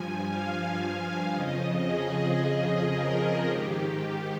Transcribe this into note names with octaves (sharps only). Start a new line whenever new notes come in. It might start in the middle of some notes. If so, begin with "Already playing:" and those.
Already playing: G2 F3 G#5
F5
F5
F2 C#3 F3 D#5
G#4
A#4
G#2 D#3 G4